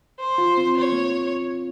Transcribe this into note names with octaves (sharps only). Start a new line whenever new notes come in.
C5
F4
C4
C#5
A#3